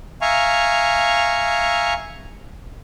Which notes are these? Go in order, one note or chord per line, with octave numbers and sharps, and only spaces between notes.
E5 F5 G#5 A#5 C#6